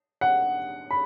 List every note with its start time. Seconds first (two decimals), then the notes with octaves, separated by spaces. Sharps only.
0.21 F#5
0.91 B5